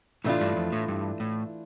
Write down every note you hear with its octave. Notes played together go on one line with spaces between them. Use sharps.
A2 E3 A3 D4 F4
G2
F2
A2
G2
A2